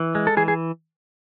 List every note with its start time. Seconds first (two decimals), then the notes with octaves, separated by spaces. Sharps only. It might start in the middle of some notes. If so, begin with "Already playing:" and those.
Already playing: E3
0.15 G#3
0.27 A4
0.37 E3 G#4
0.48 G#4